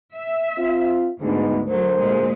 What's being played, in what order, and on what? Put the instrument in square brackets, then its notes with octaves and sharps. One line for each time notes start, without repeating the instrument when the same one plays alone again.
[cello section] E5
[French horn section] C4 F4
[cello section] D2 G#2 [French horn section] G#3 B3 D#4
[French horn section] D2 A#4 C5 [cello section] F#3
[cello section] A#2 G#3